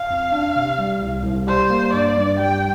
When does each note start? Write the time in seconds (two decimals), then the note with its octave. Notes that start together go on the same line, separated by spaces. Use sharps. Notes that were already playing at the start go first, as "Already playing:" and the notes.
Already playing: F5
0.10 F2
0.32 D4
0.56 C3
0.79 G3
1.02 C2
1.24 C2
1.47 G3 C5
1.70 A#3
1.93 G2 D5
2.17 G2
2.39 G3 G5